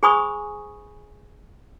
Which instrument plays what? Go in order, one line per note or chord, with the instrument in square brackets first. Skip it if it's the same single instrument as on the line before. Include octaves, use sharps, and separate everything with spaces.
[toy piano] G#4 C5 G#5 B5 C#6 D#6